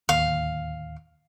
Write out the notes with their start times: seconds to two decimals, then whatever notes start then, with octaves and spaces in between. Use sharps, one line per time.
0.09 D1 D#2 F5